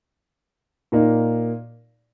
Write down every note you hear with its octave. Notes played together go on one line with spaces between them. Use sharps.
A#2 A#3 D#4